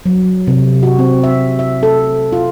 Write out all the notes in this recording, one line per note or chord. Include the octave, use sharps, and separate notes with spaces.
F#3
C3
F#4
C4
E5
E5
A4
F4